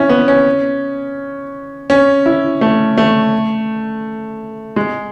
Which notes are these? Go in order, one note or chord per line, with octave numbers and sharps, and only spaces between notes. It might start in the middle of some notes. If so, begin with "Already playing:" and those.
Already playing: C#4 E4
B3
C#4
C#4
E4
A3
A3
G#3